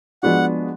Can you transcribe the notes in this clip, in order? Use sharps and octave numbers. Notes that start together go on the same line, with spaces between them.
F3 G#3 B3 D4 F#4 F#5